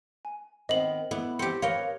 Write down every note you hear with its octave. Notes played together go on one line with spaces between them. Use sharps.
G#5
D#3 B3 C4 D#5 F#7
B3 E4 D5
C4 G4 C#7
A#4 B4 C#5 D#5 F5 G5